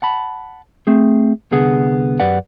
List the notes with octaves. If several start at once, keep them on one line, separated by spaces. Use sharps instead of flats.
F#5 A5 B5
A3 C4 G#4
C2 D3 B3 G#4 F#5
F#2 G4 B4 D5 F#5